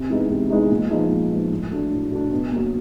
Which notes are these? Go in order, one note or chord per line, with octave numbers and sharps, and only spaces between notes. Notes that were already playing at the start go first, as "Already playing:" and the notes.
Already playing: C3
E3 G#3 B3 D#4
C3
E3 G#3 B3 D#4
A#2
F3 G#3 B3 D#4
A#2
F3 G#3 B3 D#4
A2
F#3 A3 D4
A2
F#3 A3 D4
B2
F#3 A#3